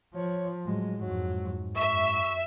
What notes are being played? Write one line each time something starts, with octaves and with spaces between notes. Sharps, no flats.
F3 C#5
A2 F#3 G#3
F2 G#2 F#3
F#2 E5 C#6